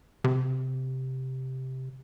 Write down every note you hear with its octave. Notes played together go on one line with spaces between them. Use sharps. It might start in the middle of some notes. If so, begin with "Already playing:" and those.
C3